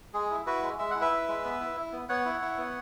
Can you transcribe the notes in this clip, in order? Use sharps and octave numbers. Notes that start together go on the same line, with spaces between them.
G#3 G#4
E4
E4 F#4 B4
G#3
G#3 E5
E4 F#5
B4 E5
E4
G#3
B3
E4
E4
B3
B3 C#5 F#5
E4
E4
B3